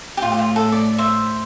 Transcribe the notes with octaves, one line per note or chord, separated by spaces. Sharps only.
G4
A2 F4
G4
F4
A4
D5
C5 E5